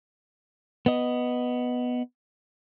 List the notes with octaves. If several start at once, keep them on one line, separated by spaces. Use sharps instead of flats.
B3 D#5